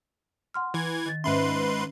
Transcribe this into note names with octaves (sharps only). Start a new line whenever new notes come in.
F#5 C6 F6
E3 G#6
D#3 A6
G#2 C#4 B4 E5 C6